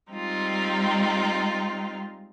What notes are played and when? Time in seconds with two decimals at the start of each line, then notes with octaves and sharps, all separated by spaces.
0.11 G3 G#3 C4 D#4 F4